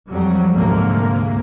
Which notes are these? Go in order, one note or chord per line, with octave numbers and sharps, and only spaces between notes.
F2 F#3 G3
D2 G#2 C3 A#3